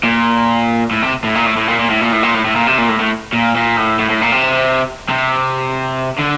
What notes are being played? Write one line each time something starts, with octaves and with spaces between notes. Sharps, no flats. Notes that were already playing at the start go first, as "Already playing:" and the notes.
A#2
A2
C3
A2
A#2
A2
A2
A#2
A#2
A2
A#2
A2
A#2
A2
A2
A#2
C3
A#2
A2
A2
A#2
A#2
A2
A2
A2
A#2
C3
C3
D3